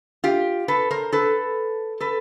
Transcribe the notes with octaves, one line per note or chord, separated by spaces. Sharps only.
F4 G4
A4 B4
A#4 C5
A4 B4
A4 B4